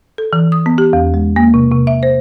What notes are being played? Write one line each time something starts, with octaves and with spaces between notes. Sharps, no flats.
A4
E3
D#6
B3
G4
E2
G#3
A#3
C3
C3
E5
C5